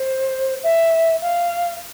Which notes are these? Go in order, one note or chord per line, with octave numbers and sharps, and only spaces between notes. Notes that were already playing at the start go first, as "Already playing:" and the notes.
Already playing: C5
E5
F5